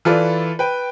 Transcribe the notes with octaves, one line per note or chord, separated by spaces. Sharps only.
E3 F4 A4 B4 D5
B4 G5